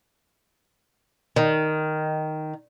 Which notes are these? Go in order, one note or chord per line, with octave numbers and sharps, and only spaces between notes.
D#3